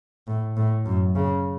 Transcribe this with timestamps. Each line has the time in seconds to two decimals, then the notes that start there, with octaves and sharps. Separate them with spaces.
0.27 A2
0.57 A2
0.86 F#2
1.16 C#3